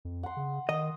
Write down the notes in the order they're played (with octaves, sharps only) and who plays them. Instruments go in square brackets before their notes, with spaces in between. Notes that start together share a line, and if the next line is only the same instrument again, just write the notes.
[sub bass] F2
[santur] F#5 C6
[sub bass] C#3
[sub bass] D#3 [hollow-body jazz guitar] D#5 [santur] D#6